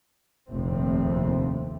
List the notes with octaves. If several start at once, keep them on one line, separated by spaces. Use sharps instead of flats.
F1 A#1 D#2 C3 A3 C4